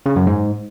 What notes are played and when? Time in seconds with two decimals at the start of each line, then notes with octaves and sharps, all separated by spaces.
0.06 C#3
0.16 F#2
0.27 G#2